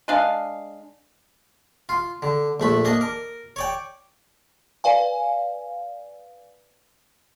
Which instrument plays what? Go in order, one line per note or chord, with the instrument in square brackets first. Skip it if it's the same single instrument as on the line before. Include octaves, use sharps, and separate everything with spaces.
[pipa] G#3 D4 F5
[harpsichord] F4
D3
A#1 A3 B5
A#3 D4 D#5
A#4
C#5 D5 G5
[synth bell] B4 D5 F5 G#5